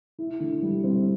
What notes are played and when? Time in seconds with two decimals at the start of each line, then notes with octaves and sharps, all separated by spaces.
0.18 E4
0.40 D3
0.62 G3
0.84 C4